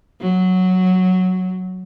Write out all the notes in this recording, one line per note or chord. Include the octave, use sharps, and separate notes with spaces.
F#3